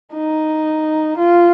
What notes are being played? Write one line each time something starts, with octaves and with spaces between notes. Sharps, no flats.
D#4
F4